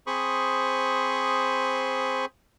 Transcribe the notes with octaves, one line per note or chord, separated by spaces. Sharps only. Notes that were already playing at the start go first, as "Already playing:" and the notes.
C4 G#4 C5 B5 C#6 D#6